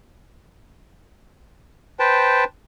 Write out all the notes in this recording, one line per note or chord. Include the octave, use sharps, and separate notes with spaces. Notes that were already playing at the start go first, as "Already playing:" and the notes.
B4 C5 G5 A5